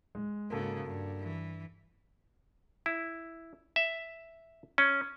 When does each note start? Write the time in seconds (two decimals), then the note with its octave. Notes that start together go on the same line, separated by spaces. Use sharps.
0.15 G#3
0.50 G#2 C#3 A#3 F#4 A4
0.86 G2
1.20 E3
2.86 E4
3.76 E5
4.78 C#4